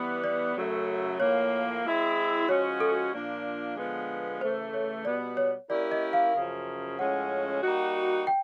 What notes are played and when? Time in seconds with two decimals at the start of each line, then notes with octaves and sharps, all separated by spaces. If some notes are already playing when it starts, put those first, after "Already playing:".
Already playing: E3 G3 B3
0.24 D5
0.56 F#2 C#3 F#3 A3
1.20 A2 F3 A#3 C#5
1.84 G#3 C4 E4 G#4
2.48 F3 G#3 C#4 F#4 C#5
2.80 A4
3.13 A#2 F3 A#3 D4
3.77 D3 F3 G#3 B3
4.41 C#3 E3 A3 C5
4.74 C#5
5.05 B2 G3 B3 D5
5.37 C#5
5.70 A#3 C#4 E4 G4 A#4 D5
5.92 D#5
6.13 F5
6.34 F#2 C#3 F3
6.98 A2 F3 G#3 C#4 F#5
7.62 G3 A#3 D#4 F#4
8.27 G5